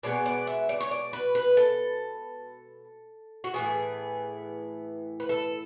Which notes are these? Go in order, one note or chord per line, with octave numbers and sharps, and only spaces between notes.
B2 G#3 B3 D5
D5
E5
D5
C#5
D5
B4
B4
A4
F#4
A2 E3 B3 G#4
B4
A4